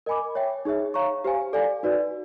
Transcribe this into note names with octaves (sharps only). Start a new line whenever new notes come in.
A#4 D#5 G#5 B5 D6
C#5 E5 G5
D#4 G#4 C#5 E5
C#5 F5 A#5 C#6
G4 C5 F5 G#5
A4 D5 F5 G#5
D#4 F#4 B4 D5